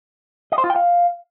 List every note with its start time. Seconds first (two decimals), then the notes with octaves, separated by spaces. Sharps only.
0.52 D#5
0.58 C5
0.64 F4
0.70 G5
0.76 F5